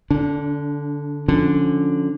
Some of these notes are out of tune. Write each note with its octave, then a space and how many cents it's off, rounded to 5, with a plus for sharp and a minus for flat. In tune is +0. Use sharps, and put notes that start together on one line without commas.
D3 -10 D4 -40
D3 +0 F3 +15 C#4 +0